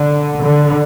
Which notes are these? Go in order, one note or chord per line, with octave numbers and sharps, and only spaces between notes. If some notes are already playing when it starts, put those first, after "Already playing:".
Already playing: D3
D3